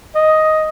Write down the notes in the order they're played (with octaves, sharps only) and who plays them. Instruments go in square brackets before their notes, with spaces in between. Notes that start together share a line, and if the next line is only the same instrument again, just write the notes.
[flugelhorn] D#5